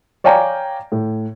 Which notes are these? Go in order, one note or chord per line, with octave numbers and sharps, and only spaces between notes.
C#5 D5 F5 G5 G#5 A#5
A2